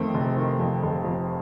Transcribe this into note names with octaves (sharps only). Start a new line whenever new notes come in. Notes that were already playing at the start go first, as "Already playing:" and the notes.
Already playing: F2 D#3 A3 C4
F1
D#3
F2
F1
F2